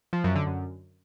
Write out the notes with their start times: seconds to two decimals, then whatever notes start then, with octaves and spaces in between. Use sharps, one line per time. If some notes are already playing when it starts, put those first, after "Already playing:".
0.13 F3
0.24 F#2
0.35 D3
0.47 F#2